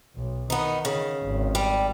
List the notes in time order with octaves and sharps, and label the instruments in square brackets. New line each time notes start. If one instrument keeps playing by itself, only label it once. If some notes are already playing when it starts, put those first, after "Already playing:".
[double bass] B1
[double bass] D#3 [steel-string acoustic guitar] B3 D#4
[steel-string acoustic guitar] C#3
[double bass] G#1
[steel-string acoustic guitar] G3